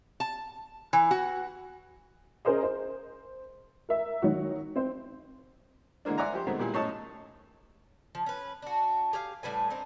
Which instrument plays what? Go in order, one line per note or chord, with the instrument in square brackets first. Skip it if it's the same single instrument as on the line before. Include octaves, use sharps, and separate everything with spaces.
[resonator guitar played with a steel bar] A5
E3
F#4
[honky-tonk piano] C#4 G#4 A#4 C5 D#5
C5
A#4 E5
D#3 F#3 D#4 F#4
C4 C5
[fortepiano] D3 E3 G#3 A#3 D4
C5 D5 E5 F#5 G#5 A#5
F3 G4 C5
D#3 F#3 G#3 A3 B3 C4
A#2 G3 E4 G#4 C5
F#2 A2 C#5 D#5 A5
[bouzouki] F3
C#4 B4
D4 F#4
G4 G#4 F5
A2 G3 B4 G#5
C4 D4 D#4